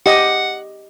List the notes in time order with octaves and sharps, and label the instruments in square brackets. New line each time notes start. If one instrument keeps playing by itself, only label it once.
[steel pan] G4 D#5 [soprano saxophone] F#5